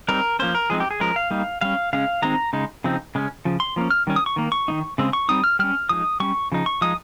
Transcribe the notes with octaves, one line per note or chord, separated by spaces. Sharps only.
G3 C4 D#4 A#4
F3 A#3 C#4 C5
A#4
F3 G#3 C4 D#4 G#4
G4
G#4
F3 G#3 C#4 A#4
F5
G3 A#3 D#4
G3 C#4 F5
C#3 G#3 C#4 F5
D#3 G#3 C4 D#4 A#5
C#3 G#3 D#4
C#3 F3 C4 D#4
C#3 G#3 C#4
C#3 F3
C6
F3 A#3 C#4
F6
D#3 G3 C#4
D#6
C#6
D#3 A#3
C#6
D#3 A#3 D#4
C#3 G#3 C4
C#6
G3 C4 D#4 D#6
F6
G3 C#4 F6
F3 G#3 D#4 D#6
G3 C#4 C#6
C#3 F3 D#4
C#6
F3 G#3 D#4 D#6